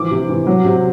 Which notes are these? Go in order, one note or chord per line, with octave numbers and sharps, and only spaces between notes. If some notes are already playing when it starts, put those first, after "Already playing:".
Already playing: E3 F3 D6
C3
E3
F#3
C3